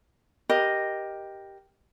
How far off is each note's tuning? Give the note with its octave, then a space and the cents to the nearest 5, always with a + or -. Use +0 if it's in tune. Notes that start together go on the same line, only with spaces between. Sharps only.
G4 +0 A#4 +15 D#5 +0